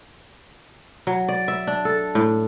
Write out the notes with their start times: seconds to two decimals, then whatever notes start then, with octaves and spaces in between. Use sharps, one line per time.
1.07 F#3
1.29 D5
1.48 E5
1.67 D4
1.85 A4
2.15 A2